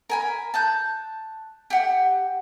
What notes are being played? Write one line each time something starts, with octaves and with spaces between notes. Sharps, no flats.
A#4 G#5 B5
A5 F#6 G6
G4 F#5